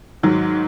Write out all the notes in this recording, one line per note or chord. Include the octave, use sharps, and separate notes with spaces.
G#2 D#3 F#3